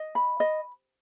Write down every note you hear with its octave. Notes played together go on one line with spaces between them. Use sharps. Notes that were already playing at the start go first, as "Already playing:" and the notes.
Already playing: D#5
B5
D#5